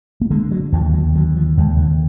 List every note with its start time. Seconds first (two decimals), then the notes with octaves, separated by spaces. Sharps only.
0.21 A#3
0.31 D3 G#3
0.51 F#3
0.72 D#2 F3
0.94 F#3
1.15 D3 F#3
1.37 F3
1.57 D#2 G#3
1.78 D3